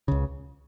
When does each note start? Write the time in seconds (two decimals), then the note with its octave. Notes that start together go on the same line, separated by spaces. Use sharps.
0.08 C#2 C#3